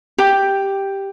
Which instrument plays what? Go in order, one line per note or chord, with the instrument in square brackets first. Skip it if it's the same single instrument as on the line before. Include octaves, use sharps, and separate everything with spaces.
[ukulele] G4